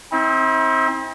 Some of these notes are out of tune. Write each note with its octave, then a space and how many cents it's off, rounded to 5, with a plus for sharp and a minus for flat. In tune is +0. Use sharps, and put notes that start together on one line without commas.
C4 +20 E4 -45